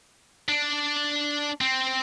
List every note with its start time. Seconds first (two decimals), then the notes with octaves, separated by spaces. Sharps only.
0.49 D4
1.61 C4